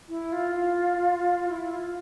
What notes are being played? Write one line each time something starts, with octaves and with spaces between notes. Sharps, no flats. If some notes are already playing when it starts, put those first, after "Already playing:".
E4
F4
F4
E4
F4